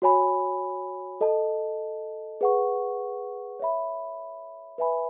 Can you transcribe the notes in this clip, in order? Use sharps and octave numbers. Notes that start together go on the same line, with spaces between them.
F#4 C#5 G#5 B5
A4 D#5 A5
G#4 B4 F#5 C#6
C#5 E5 B5
B4 E5 G#5 B5